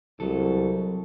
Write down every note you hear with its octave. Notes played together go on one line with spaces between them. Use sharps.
C2 F#3 A4